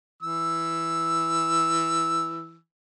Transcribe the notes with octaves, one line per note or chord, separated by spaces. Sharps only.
E3 E6